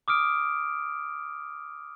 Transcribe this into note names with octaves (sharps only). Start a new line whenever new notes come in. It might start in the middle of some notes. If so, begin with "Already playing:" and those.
D6 D#6 F6 D7